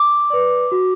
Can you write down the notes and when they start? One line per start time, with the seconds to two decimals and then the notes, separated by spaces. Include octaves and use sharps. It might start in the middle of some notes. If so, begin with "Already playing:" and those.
Already playing: D6
0.30 B4 D5
0.72 F#4